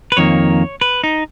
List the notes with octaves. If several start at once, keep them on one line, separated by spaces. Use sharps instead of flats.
B4
F2 D#3 A#3 C#5
B4
D#4